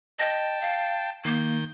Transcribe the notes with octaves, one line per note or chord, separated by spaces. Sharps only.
D#5 G5 A5
F5
D#3 A#3 G6